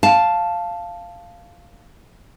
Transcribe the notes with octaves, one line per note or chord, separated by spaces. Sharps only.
F5 A5